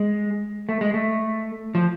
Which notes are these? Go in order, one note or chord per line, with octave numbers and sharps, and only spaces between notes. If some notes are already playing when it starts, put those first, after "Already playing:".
Already playing: G#3
A3
G#3
A3
F3